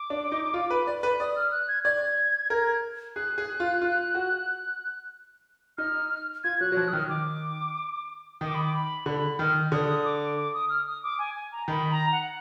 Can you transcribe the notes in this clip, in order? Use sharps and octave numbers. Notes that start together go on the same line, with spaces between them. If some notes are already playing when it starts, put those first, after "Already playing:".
Already playing: D6
D4
D#4
F4
B4
D5
B4
D5 D#6
F6
F#6
G#6
D5 G#6
A#4
G#4 F#6
G#4
F4
F4
F#4
D#4 F6
F4 G#6
F#3 F#6
F#3
F3 F#6
D#6
D#3 F6
D#3 D6
D#3 D#6
D6
B5
D6
B5
D3 B5
D#3 F6
D3 D#6
D6
D6
D#6
F6
D#6
D6
G#5
G#5
A#5
D#3 B5
A#5
F#5